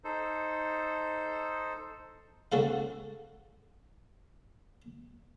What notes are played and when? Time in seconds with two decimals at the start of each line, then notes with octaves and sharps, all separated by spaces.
0.04 D#4 A4 C5
2.52 C#2 F#4 A4 F5